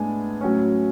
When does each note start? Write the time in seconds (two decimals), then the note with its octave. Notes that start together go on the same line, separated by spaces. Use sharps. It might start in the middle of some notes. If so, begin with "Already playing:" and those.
Already playing: A2 G#3 B3 D4 G#5
0.41 A2 F#3 C#4